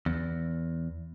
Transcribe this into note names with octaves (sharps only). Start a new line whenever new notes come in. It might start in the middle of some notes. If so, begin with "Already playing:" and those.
E2